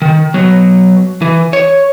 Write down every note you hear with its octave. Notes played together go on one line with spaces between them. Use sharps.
D#3
F#3 B3
E3
C#5